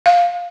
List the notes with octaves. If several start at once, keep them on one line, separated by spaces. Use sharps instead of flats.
F5